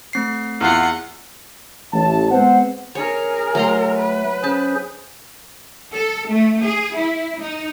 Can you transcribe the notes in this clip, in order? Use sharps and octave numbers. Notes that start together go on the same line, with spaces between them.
A3 C4 C7
E2 F4 F#5
A1 A5
G#3 B3 C4 B4 C5 F#5
G#4 A#4 C#5
F#3 A3 A#5 C6
B4
C#4 G#4 C5 A5
A4
A3
G#4
E4
D#4